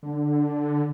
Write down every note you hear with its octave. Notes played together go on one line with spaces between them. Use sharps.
D3